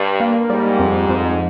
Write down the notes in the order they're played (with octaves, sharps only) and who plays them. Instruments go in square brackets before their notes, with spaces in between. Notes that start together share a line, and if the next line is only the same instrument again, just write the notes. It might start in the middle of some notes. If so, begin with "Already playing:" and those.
Already playing: [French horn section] G2
[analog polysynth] A#3
[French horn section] G#2 [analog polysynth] G3
[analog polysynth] F2
F2